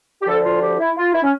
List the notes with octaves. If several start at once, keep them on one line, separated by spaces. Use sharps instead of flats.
G4
D2 D3 F3 A4
F4
G4
E4
F4
E4
C#4